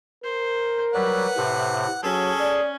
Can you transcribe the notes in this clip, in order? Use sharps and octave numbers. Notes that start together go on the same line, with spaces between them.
A#4 C5
F#3 G3 B4 F#5
A2 C3
F#3 C#4 G#4 A4
D5